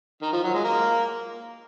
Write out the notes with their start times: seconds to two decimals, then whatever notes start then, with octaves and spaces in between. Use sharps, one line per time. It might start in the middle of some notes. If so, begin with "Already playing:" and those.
0.22 D#3
0.33 F3
0.44 F#3
0.54 G#3
0.64 A#3